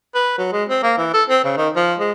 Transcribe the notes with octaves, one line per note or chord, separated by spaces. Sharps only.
B4
F#3
G#3
C4
A#3
E3
A4
C4
C#3
D#3
F3
G#3